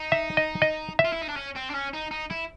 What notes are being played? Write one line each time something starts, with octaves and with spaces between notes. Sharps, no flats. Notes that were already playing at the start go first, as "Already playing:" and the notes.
Already playing: D#4
E5
D#5
D#5
E5
F4
E4
D#4
D4
C#4
C4
D4
C#4
D#4
D#4
E4